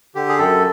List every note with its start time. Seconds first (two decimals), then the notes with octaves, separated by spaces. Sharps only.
0.15 D3 G4
0.29 G#4
0.38 F#2 A4